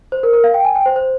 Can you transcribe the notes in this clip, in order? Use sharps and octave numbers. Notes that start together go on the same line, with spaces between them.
C5
A#4
A#4
F5
G5
G#5
G5
C5
C5